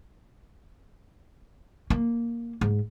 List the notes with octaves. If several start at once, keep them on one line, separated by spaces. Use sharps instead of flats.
A#3
G#2